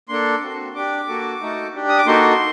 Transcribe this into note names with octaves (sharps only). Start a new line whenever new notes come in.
A#3 D4 A4 C6
C4 F#4 A4
D4 G4 D6
A#3 F#4 A4
A3 D#4 F#4 A4
D4 G4
D#6
D6
A#3 D#4 F#4 A4 C6